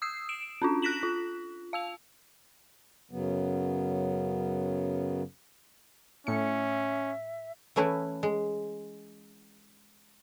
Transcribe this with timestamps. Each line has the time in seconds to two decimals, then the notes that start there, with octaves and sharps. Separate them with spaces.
0.02 D#6 E6 C7
0.29 D7 E7
0.62 C#4 D4 F4
0.82 F#6 A#6 B6 E7 F#7
1.03 F4
1.73 F5 E6 F7
3.11 F#2 C#3 F#3 B3
6.27 A2 C#4 E5 C#7
7.76 E3 A3 C#4 E4 B4
8.23 G#3